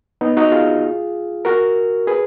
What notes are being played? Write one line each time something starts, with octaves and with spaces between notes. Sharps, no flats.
B3 D#4
D#4 F#4
F4 G#4
F#4 A#4
G#4 B4